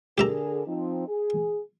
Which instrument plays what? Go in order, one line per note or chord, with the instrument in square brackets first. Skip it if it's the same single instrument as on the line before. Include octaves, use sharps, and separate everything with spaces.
[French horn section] D3 G#4 A#4 [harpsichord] G4 E5 A#5
[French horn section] F3 C4 D#4
G#4